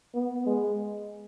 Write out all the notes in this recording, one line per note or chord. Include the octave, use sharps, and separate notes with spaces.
B3
G#3